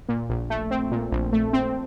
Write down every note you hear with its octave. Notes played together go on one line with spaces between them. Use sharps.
A#2
A#1
A3
C4
A#2
A#1
A3
C4